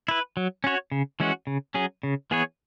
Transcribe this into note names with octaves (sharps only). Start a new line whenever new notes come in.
E4 B4
F#3
C#4 F#4 C#5
C#3
E3 G#3 C#4 F#4
C#3
F#3 C#4 G#4
C#3
E3 B3 G#4 C#5